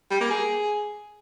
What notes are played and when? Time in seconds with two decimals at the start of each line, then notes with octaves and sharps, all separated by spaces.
0.10 G3
0.20 A#3
0.30 G#4